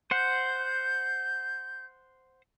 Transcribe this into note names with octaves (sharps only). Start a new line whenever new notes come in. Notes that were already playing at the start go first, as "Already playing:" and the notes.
C5 F#5 G6